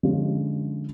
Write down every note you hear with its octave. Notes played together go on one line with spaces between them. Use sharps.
D3 F3 G#3 C#4 F4